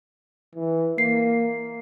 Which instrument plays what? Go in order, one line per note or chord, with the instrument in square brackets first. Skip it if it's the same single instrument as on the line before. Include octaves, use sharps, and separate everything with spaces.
[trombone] E3
[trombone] A#3 [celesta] C7